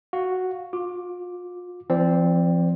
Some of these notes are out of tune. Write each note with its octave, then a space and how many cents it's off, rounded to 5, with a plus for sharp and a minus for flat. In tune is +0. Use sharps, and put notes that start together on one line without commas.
F#4 +0 F5 +10
F4 +35 D6 +0
F3 -35 C4 +0 D5 -5